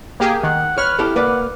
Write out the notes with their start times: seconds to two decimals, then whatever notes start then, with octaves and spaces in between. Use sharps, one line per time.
0.20 A#3 G4 G#4
0.43 D#3 F#5
0.78 B4 C#5 F6
0.99 E4 G4 A4
1.16 A#3 B4 D5 F#5